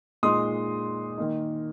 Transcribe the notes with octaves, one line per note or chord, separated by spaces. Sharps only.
A#2 G#3 D#4 C6 D#6
D#3 A#3 D#4